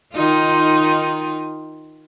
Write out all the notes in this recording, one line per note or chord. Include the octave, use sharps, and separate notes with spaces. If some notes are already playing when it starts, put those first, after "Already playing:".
D#3 D#4 F4